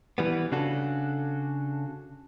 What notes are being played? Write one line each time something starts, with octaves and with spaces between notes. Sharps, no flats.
E3 G3 B3
C#3 D4 F#4 A4